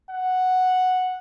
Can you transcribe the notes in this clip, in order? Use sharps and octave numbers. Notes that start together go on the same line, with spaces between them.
F#5